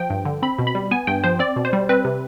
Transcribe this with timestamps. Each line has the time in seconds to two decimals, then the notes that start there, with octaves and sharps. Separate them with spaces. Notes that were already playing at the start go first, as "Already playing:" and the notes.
Already playing: F3 G5
0.10 G2
0.25 D3
0.42 C4 B5
0.59 B2
0.67 B5
0.75 G3
0.91 B3 G#5
1.07 G2 G5
1.24 F3 C5
1.39 C4 D5
1.56 B2
1.65 C5
1.73 G3
1.89 C4 B4
2.05 C3